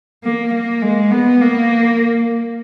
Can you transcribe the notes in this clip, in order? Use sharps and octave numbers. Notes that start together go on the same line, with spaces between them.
A#3
A#3
G#3
B3
A#3